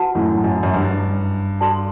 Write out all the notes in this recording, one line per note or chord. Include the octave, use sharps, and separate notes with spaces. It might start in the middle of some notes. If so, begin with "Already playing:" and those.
Already playing: F#4 B4 F#5 A5
F#2 A2
F#2
F#2
G2
F#4 A4 D5 A5 C6